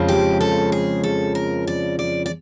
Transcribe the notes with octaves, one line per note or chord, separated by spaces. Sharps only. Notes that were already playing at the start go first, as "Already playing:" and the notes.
Already playing: F2 C#3 F3 G#3
G4
A4
G#4
A4
A#4
D5
D5
D5